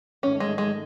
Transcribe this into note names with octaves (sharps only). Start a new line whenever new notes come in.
G#2 D#3 A3 C#4
G#3
G#3